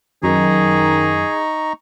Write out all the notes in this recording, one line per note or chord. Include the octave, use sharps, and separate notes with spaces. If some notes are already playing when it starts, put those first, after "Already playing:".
F#2 D#3 D#4 G#4 A#5 C#6